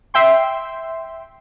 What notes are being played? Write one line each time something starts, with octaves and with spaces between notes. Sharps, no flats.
E5 G5 C6